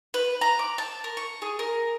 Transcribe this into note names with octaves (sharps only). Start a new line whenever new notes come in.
B4
A#5
D6
A5
A#4
C#6
G#4
A#4